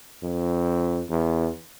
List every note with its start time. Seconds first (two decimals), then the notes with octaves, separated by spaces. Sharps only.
0.23 F2
1.10 E2